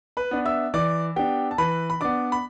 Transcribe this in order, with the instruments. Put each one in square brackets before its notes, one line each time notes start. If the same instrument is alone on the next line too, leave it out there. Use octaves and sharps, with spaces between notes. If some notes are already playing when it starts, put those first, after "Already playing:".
[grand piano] B4 B5
B3 D4
E5 E6
E3 D5 D6
B3 D4 G4 G5
A5
E3 B4 B5
B5
B3 D4 D5 D6
B5